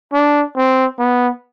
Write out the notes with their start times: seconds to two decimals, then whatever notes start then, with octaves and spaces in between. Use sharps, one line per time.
0.13 D4
0.56 C4
0.99 B3